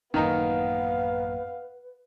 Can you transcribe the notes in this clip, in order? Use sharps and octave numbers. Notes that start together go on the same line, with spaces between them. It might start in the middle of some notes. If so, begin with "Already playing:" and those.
A1 F#2 D#3 A#3 B3 D#4 B4 F5